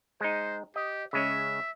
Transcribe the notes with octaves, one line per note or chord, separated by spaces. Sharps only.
G#3 D#4 C5
G4 D#5
C#3 G#3 C#4 E5